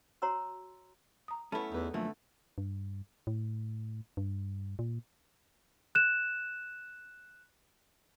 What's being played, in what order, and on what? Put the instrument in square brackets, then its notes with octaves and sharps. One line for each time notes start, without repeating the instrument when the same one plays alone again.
[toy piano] F#4 C#5 A#5 C6 E6
[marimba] A#5 D#6
[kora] A3 B3 [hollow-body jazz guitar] C#4 E4 [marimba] A5 B5
[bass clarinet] E2 [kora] D#4 B4
[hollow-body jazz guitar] F#2 F3 A#3 [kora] D3 [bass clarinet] A3
[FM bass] G2
A2
G2
A#2
[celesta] F#6 E7